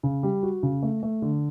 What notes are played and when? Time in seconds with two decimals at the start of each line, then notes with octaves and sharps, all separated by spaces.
0.03 C#3
0.23 G3
0.43 F#4
0.63 C#3
0.83 A3
1.03 A3
1.22 D3